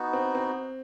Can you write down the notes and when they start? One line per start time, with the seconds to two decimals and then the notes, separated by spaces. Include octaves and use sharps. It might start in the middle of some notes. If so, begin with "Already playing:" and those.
Already playing: B3 D#4 F#4
0.13 C4
0.35 C4